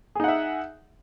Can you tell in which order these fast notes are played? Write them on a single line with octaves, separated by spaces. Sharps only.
G#4 D#4 F#5 E5